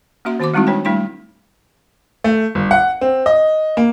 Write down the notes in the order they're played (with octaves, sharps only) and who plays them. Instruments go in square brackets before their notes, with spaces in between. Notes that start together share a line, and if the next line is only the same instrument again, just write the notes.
[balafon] A#3 C#4 F#4 E5 C6
D#3 B3 F#4 C5 C6 D6
G3 G#3 C4 D#4 E4 F#4
D4 B4 C#5 G5
G3 A3 D4 E4 G5 C6
[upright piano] A3
G1
F#5
C4
D#5
A#3